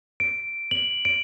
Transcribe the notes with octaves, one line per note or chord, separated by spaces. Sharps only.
D7
F#7
D7